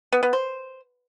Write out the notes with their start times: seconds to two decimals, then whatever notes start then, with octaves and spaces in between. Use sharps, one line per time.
0.13 B3
0.23 B3
0.33 C5